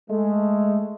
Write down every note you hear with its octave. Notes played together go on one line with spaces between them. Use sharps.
G#3 A3